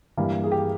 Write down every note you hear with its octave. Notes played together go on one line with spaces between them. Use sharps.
G2 E3 G3 A#3
G#4
G4